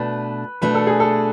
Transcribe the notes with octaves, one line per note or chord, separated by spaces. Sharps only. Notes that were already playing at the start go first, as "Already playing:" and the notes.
Already playing: B2 A3 D4 B4
B2 A3 D4 B4
A4
G#4
A4